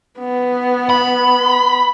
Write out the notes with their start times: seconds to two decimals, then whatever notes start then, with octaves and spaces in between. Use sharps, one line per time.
0.18 B3
0.90 B5